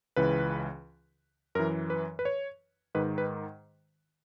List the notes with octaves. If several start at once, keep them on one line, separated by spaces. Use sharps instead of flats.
C#2 C#3 E3 B4
F#2 E3 A#4
B4
B4
C#5
G#2 D#3 B4
B4